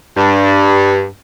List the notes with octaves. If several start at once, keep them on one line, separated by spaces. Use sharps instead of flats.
G2